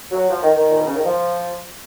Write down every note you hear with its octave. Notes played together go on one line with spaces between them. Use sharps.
F#3
F3
D#3
D#3
A#2
B2
C#3
D#3
F3